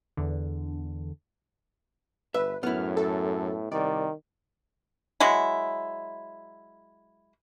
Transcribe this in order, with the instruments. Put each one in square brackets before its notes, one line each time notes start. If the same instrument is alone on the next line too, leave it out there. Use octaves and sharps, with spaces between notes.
[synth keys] E2 D3
[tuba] G1 [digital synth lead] B4 [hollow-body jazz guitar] E5
[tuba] F#2 [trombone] A2 [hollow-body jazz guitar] B3 E4 [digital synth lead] F6
[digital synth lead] A4
[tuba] C2 [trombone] D#3 [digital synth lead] D5
[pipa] F#3 G#3 E4